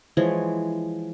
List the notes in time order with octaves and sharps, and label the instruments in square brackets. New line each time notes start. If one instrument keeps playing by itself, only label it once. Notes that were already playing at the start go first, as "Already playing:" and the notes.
[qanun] E3 F3 G#3 C#5